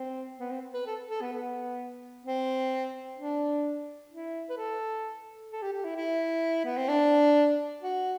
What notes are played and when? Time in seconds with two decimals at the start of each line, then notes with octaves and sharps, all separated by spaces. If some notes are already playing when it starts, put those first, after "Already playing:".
Already playing: C4
0.40 B3
0.51 C4
0.74 B4
0.87 A4
1.10 A4
1.21 B3
1.32 B3
2.25 C4
3.17 D4
4.11 E4
4.50 B4
4.58 A4
5.52 A4
5.62 G4
5.73 G4
5.84 E4
5.97 E4
6.65 B3
6.77 C4
6.88 D4
7.82 F#4